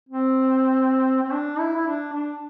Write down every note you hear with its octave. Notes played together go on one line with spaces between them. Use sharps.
C4
C4
D4
E4
E4
D4
D4